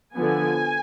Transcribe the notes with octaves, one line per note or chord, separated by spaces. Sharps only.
D3 F3 B3 G#5